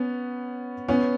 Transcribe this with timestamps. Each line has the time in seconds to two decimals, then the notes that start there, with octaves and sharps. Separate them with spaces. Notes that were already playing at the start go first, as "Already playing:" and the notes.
Already playing: B3 C#4
0.89 B3 C#4